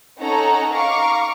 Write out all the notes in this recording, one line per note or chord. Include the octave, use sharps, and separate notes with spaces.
C#4 D#4 A4 C#5 F#5 A#5
F5 A#5 C#6 D6